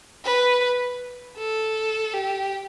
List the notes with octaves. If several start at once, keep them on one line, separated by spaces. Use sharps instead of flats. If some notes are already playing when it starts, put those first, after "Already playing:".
B4
A4
G4